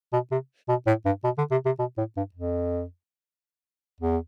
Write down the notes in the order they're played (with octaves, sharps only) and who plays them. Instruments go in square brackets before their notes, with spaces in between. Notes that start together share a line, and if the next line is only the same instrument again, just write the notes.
[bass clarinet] B2
C3
B2
A2
G2
B2
D3
C3
C3
B2
A2
G2
F2
E2